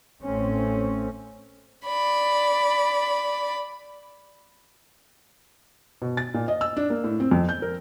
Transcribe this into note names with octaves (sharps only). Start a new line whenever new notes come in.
A1 A3 C4 C#4
D5 B5
B2
A6
A#2
D#5
E6
D4
A#3
A2
C4
F2
G6
A#4